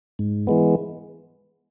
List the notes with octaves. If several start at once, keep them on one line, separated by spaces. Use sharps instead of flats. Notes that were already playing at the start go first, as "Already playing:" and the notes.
G#2
E3 G#3 B3